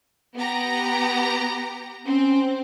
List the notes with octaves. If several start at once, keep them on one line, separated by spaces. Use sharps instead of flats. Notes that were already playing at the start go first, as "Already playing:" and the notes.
B3 G4 A#5
C4 C#4